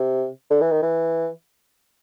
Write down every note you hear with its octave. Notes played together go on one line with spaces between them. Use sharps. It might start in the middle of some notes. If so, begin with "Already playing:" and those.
Already playing: C3
D3
E3
D#3
E3